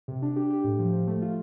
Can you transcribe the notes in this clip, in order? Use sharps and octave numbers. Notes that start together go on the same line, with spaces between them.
C3
D4
G4
G4
A2
F3
F3
A3
F4